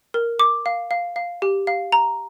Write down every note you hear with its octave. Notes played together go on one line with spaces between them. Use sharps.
A#4
D6
F5
F5
F5
G4
F5
A#5